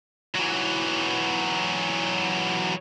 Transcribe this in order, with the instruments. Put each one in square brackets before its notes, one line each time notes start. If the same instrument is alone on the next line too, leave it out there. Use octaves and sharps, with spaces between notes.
[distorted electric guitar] E3 F#3